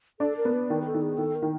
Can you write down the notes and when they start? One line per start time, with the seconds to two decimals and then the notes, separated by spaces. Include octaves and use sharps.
0.20 D4 A4
0.37 A#4
0.45 B3
0.53 B4
0.69 D#3 A#4
0.82 G#4
0.86 A4
0.94 D#3
1.02 G#4
1.18 D#3 A4
1.35 A#4
1.42 D#3